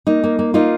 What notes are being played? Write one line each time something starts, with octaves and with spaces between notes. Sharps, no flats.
A#3 D#4
A#3
A#3
A#3 D#4 F4